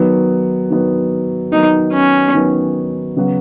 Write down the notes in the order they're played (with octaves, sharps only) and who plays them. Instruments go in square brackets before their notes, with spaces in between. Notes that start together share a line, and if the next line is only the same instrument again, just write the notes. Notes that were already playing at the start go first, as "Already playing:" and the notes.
Already playing: [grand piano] D#3 F#3 B3
D#3 F#3 B3
[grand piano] D#3 F#3 B3 [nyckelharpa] D#4
[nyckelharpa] C#4
[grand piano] D#3 F#3 B3
C#3 F#3 B3 F#4